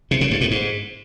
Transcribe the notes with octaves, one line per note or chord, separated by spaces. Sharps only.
C3
C#3
G2
A2
G#2